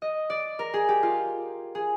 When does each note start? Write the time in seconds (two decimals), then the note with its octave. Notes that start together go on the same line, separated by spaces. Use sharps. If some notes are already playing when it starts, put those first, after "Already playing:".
0.02 D#5
0.30 D5
0.59 A#4
0.74 G#4
0.89 G4
1.03 F4
1.75 G#4